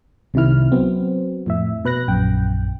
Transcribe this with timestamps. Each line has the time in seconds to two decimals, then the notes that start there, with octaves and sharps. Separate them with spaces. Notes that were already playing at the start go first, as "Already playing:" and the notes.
0.34 C2 C3 D#3 E4 F6
0.72 F#3 B3 C4
1.46 F2 A2 E5
1.84 B2 B4 F#6 A#6
2.08 A#1 F#2 G5